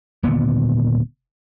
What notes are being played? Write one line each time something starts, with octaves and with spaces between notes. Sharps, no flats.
D#1 A#2 D3 B3